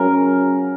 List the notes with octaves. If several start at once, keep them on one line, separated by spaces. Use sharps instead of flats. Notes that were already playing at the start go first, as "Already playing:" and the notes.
Already playing: F#2 C#3 F#3 A#4